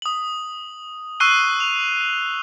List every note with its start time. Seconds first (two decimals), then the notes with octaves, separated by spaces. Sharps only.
0.02 D#6 F#7
1.20 C#6 E6 F#6 C7 D#7 G7
1.60 F7